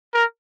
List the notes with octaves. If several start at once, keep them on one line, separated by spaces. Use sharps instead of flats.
A#4